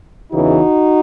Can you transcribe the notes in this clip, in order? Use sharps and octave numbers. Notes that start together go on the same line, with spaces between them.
E2 C#3 E3 D#4 F#4